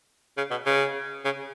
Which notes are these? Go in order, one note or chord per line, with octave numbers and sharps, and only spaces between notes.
C#3
B2
C#3
C#3